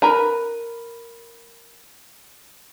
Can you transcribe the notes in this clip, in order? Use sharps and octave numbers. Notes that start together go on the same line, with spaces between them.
A#4 B4 A#5